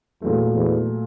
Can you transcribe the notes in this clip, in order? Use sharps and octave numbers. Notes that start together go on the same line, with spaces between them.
E2 A#2 F#3 A3
E2